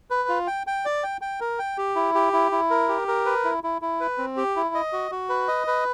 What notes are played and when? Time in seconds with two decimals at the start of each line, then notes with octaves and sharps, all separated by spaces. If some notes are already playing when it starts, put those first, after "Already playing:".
0.10 B4
0.29 F4
0.47 G5
0.67 G5
0.85 D5
1.03 G5
1.21 G5
1.40 A#4
1.59 G5
1.78 G4
1.96 E4
2.15 G4
2.33 E4
2.52 E4
2.70 A#4
2.89 G4
3.08 A#4
3.25 B4
3.44 E4
3.64 E4
3.82 E4
4.00 B4
4.18 C4
4.37 G4
4.56 E4
4.75 D#5
4.93 F#4
5.11 F#4
5.29 B4
5.48 D#5
5.67 B4